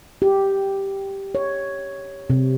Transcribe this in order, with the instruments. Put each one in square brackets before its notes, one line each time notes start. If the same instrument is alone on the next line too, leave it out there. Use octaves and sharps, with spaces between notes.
[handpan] G4
C#5
C3